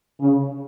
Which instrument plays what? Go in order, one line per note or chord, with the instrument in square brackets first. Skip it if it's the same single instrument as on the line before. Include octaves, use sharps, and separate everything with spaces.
[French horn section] C#3